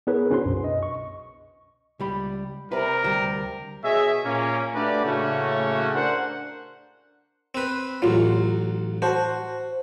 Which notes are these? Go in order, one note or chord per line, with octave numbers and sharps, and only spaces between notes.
B3 E4 G#4 A#4 B4 C#5
C#4 D4 F#4 B4 C5 C6
C2 F#2 B2
D#5
C#6
C#2 G3 B5
C3 A#4 B4 D5
D2 G3 G4 G5 A5
B2 G#4 C#5 D#5 E5
A#2 A#3 C#4
A3 D4 F#4 G4 B4 D5
A2 C#3 A3 A#3 C#4 F#4
D4 A#4 C5 F#5
C4 B4
A1 F#3 F4
F#4 C5 A5